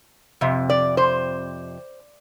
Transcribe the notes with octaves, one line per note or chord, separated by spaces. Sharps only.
F2 C3
D5
C5